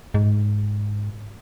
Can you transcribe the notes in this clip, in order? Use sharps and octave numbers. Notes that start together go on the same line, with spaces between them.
G#2